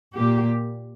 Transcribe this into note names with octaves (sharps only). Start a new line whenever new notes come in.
A#2 A#3 G4